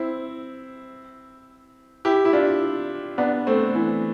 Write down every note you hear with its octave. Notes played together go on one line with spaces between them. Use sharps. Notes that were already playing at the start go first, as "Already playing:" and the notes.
Already playing: C4 E4
E4 G4
E4
D4 F4
B3 D4
A3 C4
E3